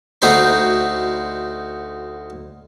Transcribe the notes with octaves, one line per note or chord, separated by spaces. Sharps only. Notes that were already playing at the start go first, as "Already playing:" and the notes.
D2 D#4 F#4 C5 B5 C6